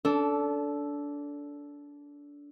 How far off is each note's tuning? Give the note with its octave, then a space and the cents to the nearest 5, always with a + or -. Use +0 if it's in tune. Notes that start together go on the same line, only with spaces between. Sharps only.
D4 -25 A4 +0